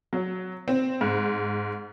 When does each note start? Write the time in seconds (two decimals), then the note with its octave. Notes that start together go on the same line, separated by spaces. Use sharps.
0.13 F#3
0.68 C4
1.01 G#2